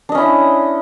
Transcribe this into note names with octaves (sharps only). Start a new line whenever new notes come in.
C#4 D4 E4 D#5